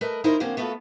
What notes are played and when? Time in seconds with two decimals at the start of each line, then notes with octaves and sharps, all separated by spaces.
0.01 A3 A#4 B4 D#5
0.24 D#2 D#4 E4 A#4 C5
0.40 D3 F3 A#3 C4 C#4
0.57 A3 B3 F4 F#4 A4